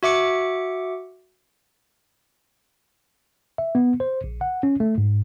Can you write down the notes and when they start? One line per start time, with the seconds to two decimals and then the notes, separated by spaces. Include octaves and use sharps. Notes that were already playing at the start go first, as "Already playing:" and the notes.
0.03 F#4 E5 D6 C#7
3.58 E5
3.75 B3
4.00 C5
4.24 A#1
4.41 F#5
4.63 C#4
4.80 A3
4.98 G#2